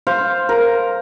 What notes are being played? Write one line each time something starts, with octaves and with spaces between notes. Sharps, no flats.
C5 F5
A#4